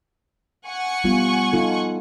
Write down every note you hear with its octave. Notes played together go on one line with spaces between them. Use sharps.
F#5 G#5 C#6
G3 B3 F4
D#4 F4 A4